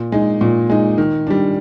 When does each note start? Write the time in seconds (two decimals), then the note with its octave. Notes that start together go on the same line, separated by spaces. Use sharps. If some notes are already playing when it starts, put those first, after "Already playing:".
Already playing: A#2
0.12 G#3 D#4
0.41 A#2
0.70 G#3 D#4
0.98 D#3
1.27 G3 D4